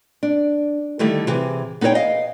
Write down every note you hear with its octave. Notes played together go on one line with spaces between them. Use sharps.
D4
D3 D#3 G3 A3 E4
C3 E3 G#4
B3 D#4 G#4 A4 C#5 G5
D#5 F5